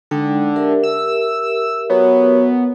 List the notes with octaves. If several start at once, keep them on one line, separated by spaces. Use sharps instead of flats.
D3 G#3 D#4 G5
G4 A#4 E5
E6
F#3 B3